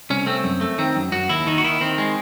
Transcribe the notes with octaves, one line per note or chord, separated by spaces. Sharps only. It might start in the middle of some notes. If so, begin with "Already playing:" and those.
C2 C#4
A3 C4
F#2
A3
D#3 C4
F#2
F#2 F#4
D#2 E4
D#3 D#4
F#4
D#3 E4
D#3 C4
G#3